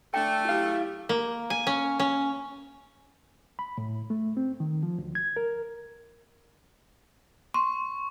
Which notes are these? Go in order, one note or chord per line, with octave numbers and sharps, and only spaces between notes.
A3 D4 G5
F#3 E4 G4 F5
A#3
G#5
C#4
C#4
B5
A2
A3
C4
D#3
F3
D2
G#6
A#4
C6 C#6